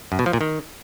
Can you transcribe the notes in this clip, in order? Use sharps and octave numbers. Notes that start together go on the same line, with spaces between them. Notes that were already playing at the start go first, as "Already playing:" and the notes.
F#2
B2
F3
A#2
D#3